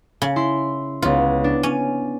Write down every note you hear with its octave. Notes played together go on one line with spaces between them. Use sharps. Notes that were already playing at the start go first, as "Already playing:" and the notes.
C#3
E4 C6
C#2 B3 F4
D4
C#4 D#7